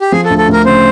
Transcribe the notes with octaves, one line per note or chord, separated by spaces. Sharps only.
G4
F3 G#4
A4
D2
A4
D2 A#4
C#3 C5